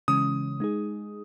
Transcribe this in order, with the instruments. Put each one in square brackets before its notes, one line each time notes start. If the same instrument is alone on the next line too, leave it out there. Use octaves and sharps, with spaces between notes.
[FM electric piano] C#3 E3 G#3 C#4 [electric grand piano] D#6
[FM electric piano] G#3 D#4 G#4